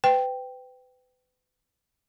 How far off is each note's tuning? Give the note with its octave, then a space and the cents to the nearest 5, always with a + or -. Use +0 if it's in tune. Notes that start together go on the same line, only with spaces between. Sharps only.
B4 +35 G5 +0